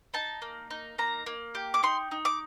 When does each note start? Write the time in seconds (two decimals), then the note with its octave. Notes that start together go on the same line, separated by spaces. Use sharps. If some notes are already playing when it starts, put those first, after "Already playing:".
0.14 D#4 A5
0.42 A#3
0.70 D#4
0.98 A#3 A#5
1.26 A#3
1.55 G4
1.74 D6
1.83 D#4 C6
2.11 D#4
2.25 D6